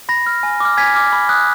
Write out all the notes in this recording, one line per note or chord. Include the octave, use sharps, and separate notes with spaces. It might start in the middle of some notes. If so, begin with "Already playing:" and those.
B5 A#6
F6
G#5
D6 F6
G#5 G#6 B6
D6 F6
B5
D#6 F#6